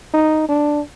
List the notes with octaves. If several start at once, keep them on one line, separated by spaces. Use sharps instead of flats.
D#4
D4